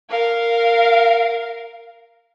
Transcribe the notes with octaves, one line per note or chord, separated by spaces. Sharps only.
A#4 F5